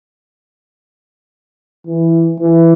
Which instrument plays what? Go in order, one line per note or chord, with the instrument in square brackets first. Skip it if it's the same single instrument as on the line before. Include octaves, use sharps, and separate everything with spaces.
[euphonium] E3
E3